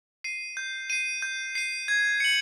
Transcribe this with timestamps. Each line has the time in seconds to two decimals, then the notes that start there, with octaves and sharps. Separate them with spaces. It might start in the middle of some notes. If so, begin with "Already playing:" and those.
0.24 C7 D#7
0.57 G6
0.90 C7 D#7
1.22 G6
1.55 C7 D#7
1.88 G#6
2.20 C#7 F#7